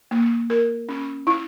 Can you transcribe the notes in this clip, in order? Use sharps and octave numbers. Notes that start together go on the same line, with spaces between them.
A#3
A#4
C#4
E4